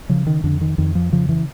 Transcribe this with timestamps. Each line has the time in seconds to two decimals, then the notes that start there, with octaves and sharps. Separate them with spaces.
0.09 C#3 F3
0.27 D#3
0.44 F2 D3
0.61 D#3
0.78 F2 D#3
0.95 F3
1.12 C#3 F3
1.29 E3